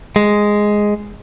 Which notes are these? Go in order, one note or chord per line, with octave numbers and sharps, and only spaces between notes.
G#3